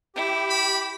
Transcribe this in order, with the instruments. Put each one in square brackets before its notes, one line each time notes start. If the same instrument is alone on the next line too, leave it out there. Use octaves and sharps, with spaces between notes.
[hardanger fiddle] E4 [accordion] G4
[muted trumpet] B5